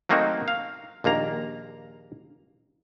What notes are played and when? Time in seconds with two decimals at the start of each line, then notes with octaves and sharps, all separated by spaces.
0.09 F#3 A3 A#3 C4 D#4 F#4
0.48 F5
1.04 A#1 D#2 A#3 A#5